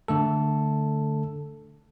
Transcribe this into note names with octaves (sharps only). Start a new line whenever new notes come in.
D3 A3 A4